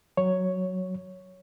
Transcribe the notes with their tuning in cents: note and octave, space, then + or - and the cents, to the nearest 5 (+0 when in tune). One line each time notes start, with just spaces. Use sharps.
F#3 +0 C#5 +0